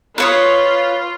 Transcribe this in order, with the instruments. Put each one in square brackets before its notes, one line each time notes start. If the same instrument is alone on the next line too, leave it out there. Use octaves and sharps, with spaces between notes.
[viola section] F4 [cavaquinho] B4 C#5 D#6